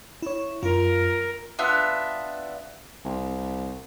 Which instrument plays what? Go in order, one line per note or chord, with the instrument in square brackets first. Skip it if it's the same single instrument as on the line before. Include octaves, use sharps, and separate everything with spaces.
[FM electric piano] E4 C#5
[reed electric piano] F#2 [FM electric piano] F4 [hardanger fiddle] A#4
[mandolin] B3 D4 F4 E5
[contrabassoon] C2